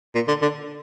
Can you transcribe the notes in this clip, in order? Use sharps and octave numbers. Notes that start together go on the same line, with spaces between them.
A#2
D3
D3